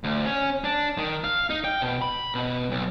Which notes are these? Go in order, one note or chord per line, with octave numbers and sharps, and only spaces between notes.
D2
C#4
D4
D#3
F5
D#4
G5
B2
B5
B2
B1